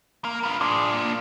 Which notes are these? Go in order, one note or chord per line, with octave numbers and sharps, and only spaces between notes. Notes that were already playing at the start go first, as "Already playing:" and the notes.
A#3
B3 F4
D4 F4 G#4 C6 D6
A#3